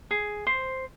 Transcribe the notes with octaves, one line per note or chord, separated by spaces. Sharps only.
G#4
C5